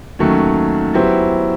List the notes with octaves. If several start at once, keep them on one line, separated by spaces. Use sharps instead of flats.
D#2 D#3 F#3 A3 C#4
F#3 B3 E4 G4 C5